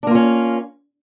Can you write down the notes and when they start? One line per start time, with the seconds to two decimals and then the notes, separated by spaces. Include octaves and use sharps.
0.03 D4
0.07 A#3
0.11 F4
0.15 C#4